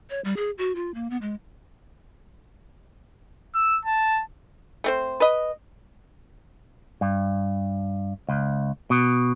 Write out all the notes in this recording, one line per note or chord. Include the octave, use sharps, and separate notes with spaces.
C#5
G3
G#4
F#4
F4
A#3
B3
G#3
E6
A5
A3 C4 C5
B4 D#5
G2
C#2
B2